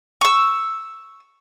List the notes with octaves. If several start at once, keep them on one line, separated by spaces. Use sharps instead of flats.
C#6 E6